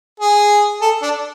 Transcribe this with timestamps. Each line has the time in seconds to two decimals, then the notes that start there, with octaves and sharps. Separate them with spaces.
0.20 G#4
0.82 A4
1.02 D4